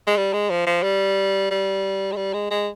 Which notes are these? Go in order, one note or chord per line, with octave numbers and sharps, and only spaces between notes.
G#3
G3
G#3
F3
F3
G3
G3
G#3
G3
G#3
G#3